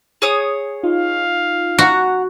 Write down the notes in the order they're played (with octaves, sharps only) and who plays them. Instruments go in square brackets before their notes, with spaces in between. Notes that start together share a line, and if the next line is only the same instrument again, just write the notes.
[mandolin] G#4 C#5 D#6
[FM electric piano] D#4 F4 [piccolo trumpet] F5
[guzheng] F#4 [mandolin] F#5 A#5